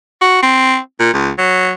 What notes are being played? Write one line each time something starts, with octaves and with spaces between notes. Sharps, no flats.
F#4
C4
A#2
C#2
F#3